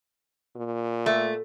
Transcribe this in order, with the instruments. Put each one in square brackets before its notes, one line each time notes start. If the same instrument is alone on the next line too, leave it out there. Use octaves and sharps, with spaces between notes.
[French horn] A#2
[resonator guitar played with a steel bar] A3